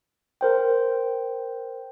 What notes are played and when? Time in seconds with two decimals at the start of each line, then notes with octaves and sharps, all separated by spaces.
0.41 A#4 C5 G5